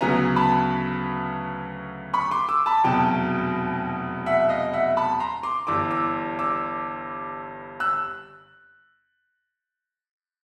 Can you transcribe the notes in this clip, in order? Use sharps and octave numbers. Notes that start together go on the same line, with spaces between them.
D2 C#3 F#3 B3 G#5 A#5
A5 B5
B5 C#6
C6 D6
D6 E6
A5 B5
F1 E2 B2 F#3 G5 A5
E5 F#5
D#5 F5
E5 F#5
A5 B5
A#5 C6
C6 D6
G1 G2 E3 G3 D6 E6
D6 E6
D6 E6
E6 F#6